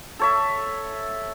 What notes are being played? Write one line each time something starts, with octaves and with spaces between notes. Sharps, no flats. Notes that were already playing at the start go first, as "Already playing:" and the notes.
A4 C#5 E5